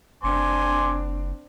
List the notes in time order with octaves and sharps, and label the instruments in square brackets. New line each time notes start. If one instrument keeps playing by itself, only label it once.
[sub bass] F#1 [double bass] C4 D4 [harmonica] G#5 C6 D6